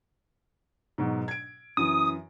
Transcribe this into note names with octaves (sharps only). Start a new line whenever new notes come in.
G#2 B2 F#3
G#6 D7
F#2 E3 D#6